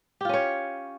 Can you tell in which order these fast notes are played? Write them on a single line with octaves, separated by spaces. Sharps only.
G4 F4 C#4 C#5